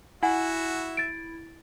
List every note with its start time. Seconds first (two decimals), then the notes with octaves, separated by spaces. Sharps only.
0.23 E4 F#4 E5 F#5 G#5
0.97 A6 D7